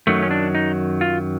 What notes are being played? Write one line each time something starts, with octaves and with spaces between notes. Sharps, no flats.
F#2 D#3 F#3 A3
C#4
D4
D#4
F4